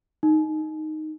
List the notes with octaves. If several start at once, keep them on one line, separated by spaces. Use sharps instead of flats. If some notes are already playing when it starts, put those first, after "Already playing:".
D#4